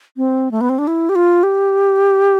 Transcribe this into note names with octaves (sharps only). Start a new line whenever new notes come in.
C4
A3
B3
C4
D4
E4
G4
F4
G4